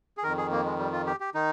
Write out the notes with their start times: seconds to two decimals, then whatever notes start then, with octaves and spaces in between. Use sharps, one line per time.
0.17 G#4
0.23 F2 D#3 A#4
0.37 G#4
0.52 A#3
0.65 G#3
0.79 G3
0.92 F4
1.06 G4
1.20 G4
1.34 D#3 D#4